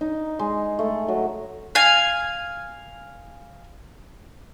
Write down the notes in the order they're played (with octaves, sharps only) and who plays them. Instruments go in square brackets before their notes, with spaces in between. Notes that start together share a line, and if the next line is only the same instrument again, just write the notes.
[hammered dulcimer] D#4
G#3
A3
F#3
[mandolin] F5 G#5